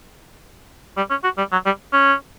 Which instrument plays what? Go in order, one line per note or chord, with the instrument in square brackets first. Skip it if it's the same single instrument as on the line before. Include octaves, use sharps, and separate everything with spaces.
[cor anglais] G3
C#4
F#4
G3
F#3
G3
C#4